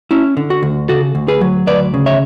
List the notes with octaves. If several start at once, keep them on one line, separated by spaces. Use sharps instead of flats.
C#4 E4
D3
F#4
D2
C#3 F#4 A4
D2
G#4 B4
F#3
D2 B4 D5
C#3
C#5 E5